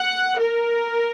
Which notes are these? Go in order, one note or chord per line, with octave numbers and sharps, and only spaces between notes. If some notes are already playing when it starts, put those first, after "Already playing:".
Already playing: F#5
A#4